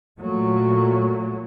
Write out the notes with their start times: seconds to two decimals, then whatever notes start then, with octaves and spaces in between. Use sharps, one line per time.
0.18 A#2 F#3 A3